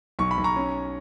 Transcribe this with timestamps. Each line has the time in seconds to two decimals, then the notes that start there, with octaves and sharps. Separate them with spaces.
0.19 B1 C#6
0.31 B5
0.38 B1
0.44 A#5 C#6
0.56 C#4